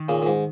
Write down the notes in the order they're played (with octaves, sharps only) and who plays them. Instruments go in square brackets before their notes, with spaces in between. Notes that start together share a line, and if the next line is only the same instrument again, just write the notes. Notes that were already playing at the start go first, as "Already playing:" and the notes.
Already playing: [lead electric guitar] D#3
[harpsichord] A#2 C#3
A#2
G#2